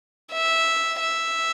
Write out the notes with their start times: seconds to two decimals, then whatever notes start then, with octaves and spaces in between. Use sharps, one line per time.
0.33 E5
1.00 E5